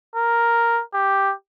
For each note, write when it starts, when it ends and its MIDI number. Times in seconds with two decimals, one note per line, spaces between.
0.15 0.81 70
0.94 1.33 67